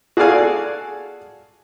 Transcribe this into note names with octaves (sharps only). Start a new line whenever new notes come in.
F#4 G#4 A4 D5 F5 G#5